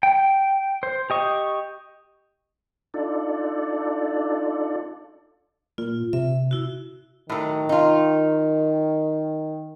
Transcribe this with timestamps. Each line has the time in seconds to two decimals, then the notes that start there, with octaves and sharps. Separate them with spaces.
0.03 G5
0.83 C5
1.10 G4 D#5 C#6
2.94 D4 D#4 F4 A4 D5
5.78 A#2 F4
6.13 C3 E5
6.51 E4 F#4
7.29 A2 D#3 F#3
7.69 D#4 F4